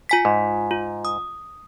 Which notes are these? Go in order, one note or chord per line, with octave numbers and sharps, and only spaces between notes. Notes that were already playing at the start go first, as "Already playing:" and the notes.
F4 G#5 B6
G#2
F4
D#6